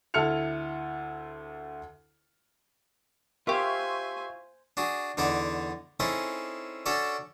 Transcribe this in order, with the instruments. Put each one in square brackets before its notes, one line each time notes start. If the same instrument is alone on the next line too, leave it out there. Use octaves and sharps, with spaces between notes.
[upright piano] D2 E4 A4 F6 C#7 F7
[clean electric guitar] F4 [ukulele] G4 A#4 [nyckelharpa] C5 G#5 [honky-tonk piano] E5 C#6
[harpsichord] D4 F#4 G#4
E2 D3 D4 D#4 F#5 D6
C4 C#4 D#4 E4 G#4 A4
C#4 D4 F#4 A4 C#5 D5